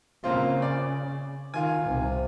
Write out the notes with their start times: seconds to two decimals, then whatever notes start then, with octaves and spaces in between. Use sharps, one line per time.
0.24 C#3 A#3 C4 F4
0.62 D5
1.54 D#3 F4 G#5
1.86 C2 C3